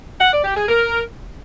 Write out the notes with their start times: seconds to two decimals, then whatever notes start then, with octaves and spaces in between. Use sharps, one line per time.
0.20 F#5
0.32 D5
0.44 G4
0.56 G#4
0.68 A#4